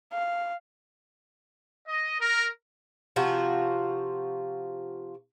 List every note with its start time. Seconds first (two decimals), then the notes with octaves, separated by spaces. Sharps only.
0.12 F5
1.87 D#5
2.21 A#4
3.16 C3 F3 F4 F#4